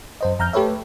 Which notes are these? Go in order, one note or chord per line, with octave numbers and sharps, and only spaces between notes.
F#2 C5 D#5
F2 A#5 F6 G6
A3 G4 A4 B4 C#5 E5